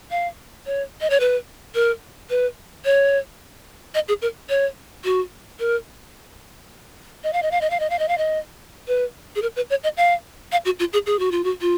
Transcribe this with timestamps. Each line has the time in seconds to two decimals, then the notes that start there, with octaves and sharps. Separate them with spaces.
0.11 F5
0.66 C#5
1.01 D#5
1.10 C#5
1.20 B4
1.75 A#4
2.30 B4
2.85 C#5
3.95 D#5
4.08 G#4
4.22 A#4
4.49 C#5
5.04 F#4
5.59 A#4
7.24 D#5
7.33 F5
7.42 D#5
7.51 F5
7.61 D#5
7.70 F5
7.80 D#5
7.90 F5
7.99 D#5
8.08 F5
8.18 D#5
8.88 B4
9.36 G#4
9.42 A#4
9.56 B4
9.70 C#5
9.84 D#5
9.97 F5
10.52 F5
10.65 F#4
10.79 F4
10.93 G#4
11.06 G#4
11.19 F#4
11.31 F4
11.44 F#4
11.61 F4